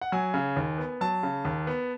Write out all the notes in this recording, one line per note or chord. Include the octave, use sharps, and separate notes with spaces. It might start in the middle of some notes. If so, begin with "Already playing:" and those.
F#5
F#3 G#5
C#3
D#2
B3
F#3 A5
C#3
D#2
B3